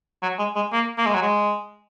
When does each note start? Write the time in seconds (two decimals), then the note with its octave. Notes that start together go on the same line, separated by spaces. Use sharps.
0.22 F#3
0.39 G#3
0.56 G#3
0.72 A#3
0.97 A#3
1.06 G#3
1.14 F#3
1.22 G#3